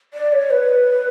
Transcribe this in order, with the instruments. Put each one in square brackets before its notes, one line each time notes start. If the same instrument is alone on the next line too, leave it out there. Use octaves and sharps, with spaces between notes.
[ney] D5
C#5
B4